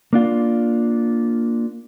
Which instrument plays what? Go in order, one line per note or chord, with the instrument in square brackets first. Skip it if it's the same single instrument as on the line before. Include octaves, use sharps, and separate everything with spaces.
[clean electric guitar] A#3 D4 F4